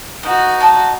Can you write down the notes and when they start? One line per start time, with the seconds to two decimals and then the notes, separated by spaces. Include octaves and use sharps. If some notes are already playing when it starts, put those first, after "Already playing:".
0.23 B3 D#4 F#4
0.60 D#5 A5